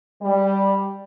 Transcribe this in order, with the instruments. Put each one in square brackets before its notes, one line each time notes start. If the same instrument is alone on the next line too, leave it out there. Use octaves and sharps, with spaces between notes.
[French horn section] G3